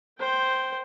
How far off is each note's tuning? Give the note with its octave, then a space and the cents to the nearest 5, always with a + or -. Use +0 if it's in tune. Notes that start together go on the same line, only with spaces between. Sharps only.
C5 +0 G5 -10